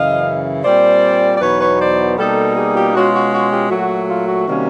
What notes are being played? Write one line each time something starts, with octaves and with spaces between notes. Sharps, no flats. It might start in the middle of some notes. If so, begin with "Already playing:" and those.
Already playing: F#2 C#3 E3 D#5 F5
A#2 G3 C4 C5 D5
D5
E2 B2 F#3 B3 D#4 B4 C#5
B4 C#5
C5 D5
B2 G3 A#3 D#4 G4 A4
F#4 G#4
F4 G4
B2 G#3 C#4 F4 F#4
F#4
F#4
F4 G4
A#2 F#3 A3 F#4
F4
F#4
C3 D#3 G3 A#3 C#4